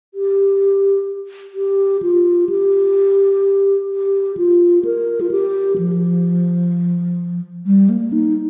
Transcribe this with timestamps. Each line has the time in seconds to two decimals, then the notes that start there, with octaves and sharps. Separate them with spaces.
0.14 G4
1.55 G4
2.03 F4
2.49 G4
3.90 G4
4.37 F4
4.85 A#4
5.21 F4
5.31 G4
5.78 F3
7.66 G3
7.90 A#3
8.12 D#4